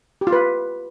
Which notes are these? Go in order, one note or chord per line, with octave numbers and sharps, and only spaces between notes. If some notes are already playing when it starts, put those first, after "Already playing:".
G4
F4
B4